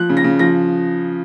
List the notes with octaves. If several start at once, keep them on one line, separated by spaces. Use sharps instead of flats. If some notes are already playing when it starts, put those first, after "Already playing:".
Already playing: F3 F#6
C#3
A#6
C#3
F3 A#6